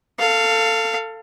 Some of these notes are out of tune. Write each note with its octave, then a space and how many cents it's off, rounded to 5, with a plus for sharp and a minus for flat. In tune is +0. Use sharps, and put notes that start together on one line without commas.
A4 +20 F5 -10